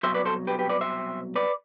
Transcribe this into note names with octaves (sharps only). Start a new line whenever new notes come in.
C2 B2 F#3 C5 E5
B4 D5
A4 C5
G4 B4
G4 B4
B4 D5
C5 E5
B4 D5